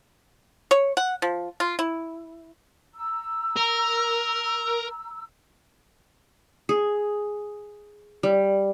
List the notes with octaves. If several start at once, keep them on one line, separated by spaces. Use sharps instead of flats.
C#5
F#5
F3
F4
E4
A#5 E6
A#4
G#4
G3